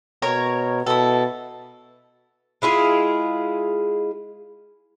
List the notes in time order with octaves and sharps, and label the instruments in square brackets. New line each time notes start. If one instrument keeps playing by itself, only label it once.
[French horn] B2 [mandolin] A#4 C#5 A#5
[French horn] B2 [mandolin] E4 A4
[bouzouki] G#3 E4 F4 G#4